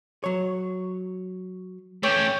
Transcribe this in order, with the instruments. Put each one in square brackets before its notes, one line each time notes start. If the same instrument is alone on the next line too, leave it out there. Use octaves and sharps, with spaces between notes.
[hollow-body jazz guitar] F#3 C#5
[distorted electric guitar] A3 C#4 [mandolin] C#5 [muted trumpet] G5